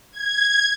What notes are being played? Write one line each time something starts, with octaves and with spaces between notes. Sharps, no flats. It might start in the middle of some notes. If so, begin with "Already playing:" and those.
G#6